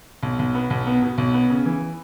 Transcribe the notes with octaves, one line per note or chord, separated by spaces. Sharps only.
B1
B1
B3
B1
B3
B2
B1
B3
C#3
E3